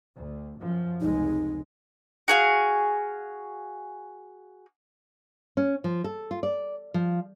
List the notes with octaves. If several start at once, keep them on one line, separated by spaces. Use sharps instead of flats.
D2
F#2 F3
F1 C#2 G#3 D#4
F#4 G#4 F5
C#4
F3
A4
F4
D5
F3